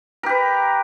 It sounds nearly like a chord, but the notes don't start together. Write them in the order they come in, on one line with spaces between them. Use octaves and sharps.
A#4 G4 B4